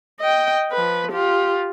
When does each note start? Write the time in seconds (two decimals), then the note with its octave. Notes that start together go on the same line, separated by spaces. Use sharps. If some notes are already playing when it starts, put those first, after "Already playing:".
0.20 D#5 G5
0.72 F3 B4
1.12 F4 G4